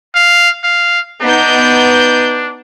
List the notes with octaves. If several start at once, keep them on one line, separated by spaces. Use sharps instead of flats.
F5
F5
B3 D4 D#4 G6